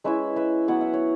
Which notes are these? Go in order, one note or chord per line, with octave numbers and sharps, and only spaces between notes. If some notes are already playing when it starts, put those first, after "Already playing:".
G#3 C#4 E4 B4 E5
B4 E5
F#3 B3 E4 F#5
E5
C#5